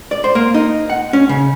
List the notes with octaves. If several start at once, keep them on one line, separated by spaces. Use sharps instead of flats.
D5
C5
A#3
D#4
F#5
C#4
C#3